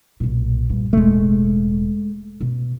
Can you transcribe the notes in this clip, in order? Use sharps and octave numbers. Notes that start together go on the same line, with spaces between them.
B1 A#2
G2 A#2
E1 A1 G#3 A3
B2